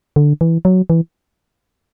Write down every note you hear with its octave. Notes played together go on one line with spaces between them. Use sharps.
D3
E3
F#3
E3